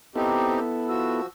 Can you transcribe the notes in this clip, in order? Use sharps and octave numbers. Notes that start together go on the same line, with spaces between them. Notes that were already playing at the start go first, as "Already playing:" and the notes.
B3 C4 D#4 E4 G4 A4
F3 F#4 E6